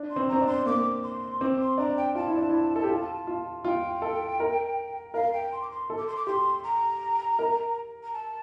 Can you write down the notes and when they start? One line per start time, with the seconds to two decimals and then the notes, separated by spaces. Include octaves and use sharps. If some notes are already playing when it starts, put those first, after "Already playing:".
Already playing: D4
0.10 C6
0.16 C4
0.29 C4 A#5
0.41 D4
0.47 C6
0.66 A#3 D6
1.03 C6
1.41 C4 D6
1.60 C6
1.78 D4 A#5
1.97 G5
2.15 F4 A5
2.27 E4
2.37 D4
2.49 E4
2.76 A4
2.83 G4
2.90 F4
3.27 F4
3.65 F4 G5
4.02 A4
4.40 A#4
5.14 A#4 F5
5.33 G5
5.52 C6
5.61 D6
5.71 C6
5.90 A4
5.98 D6
6.07 C6
6.16 D6
6.27 G4 C6
6.64 A#5
7.39 A#4
8.03 A#5
8.13 A5